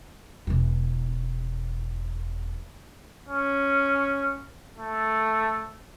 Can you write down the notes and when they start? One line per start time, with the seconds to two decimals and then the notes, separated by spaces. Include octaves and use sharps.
0.47 E1 E3
3.29 C#4
4.76 A3